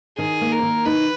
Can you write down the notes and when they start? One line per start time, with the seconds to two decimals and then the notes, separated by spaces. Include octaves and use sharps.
0.18 D#3 G#4
0.41 A#3
0.52 A#4
0.62 D#3
0.85 D#4 B4